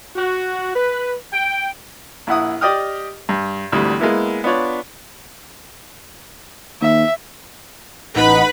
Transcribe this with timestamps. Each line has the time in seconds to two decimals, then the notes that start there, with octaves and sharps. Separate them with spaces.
0.15 F#4
0.74 B4
1.32 G5
2.27 A#1 E4 F#5 D#6
2.61 G4 D5 D#5 G5 D#6 F6
3.29 G2
3.72 G#1 D2 E3 G3
4.00 G#3 A#3 B3 E4
4.44 B3 D4 F4 C#5 D5
6.82 D#2 E5
8.15 A1 D#4 B4 F#5 B5